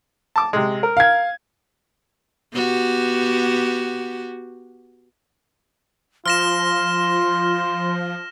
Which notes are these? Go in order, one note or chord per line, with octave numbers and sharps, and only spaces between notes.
A5 D6
C3 G#3
A#4
F5 G#6
B3 F#4 G4
F3 F4 C6 F6 A#6 E7